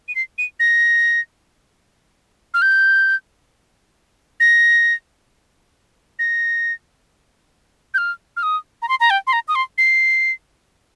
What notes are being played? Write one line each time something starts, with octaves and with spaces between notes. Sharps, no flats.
D#7
C7
D#7
A#6
F6
G6
A#6
A#6
G6
F6
F6
D#6
A#5
C6
A#5
G5
C6
A#5
D#6
C6
C7